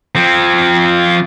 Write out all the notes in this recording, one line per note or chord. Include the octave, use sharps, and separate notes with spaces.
F3 C4